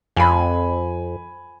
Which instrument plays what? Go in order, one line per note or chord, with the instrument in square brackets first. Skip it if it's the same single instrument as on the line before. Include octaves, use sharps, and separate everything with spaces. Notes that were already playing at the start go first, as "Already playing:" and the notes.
[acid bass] F2 [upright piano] G#5 B5